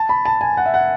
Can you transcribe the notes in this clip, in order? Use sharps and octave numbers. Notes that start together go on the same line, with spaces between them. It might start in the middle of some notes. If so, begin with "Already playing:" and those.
Already playing: A5
B5
A5
G#5
F#5
E5
F#5